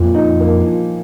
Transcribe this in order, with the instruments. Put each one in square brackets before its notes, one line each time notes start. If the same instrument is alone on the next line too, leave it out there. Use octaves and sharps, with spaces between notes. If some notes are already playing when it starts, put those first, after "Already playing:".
Already playing: [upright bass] F2 [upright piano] A#2
[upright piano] D#4
A#3
F3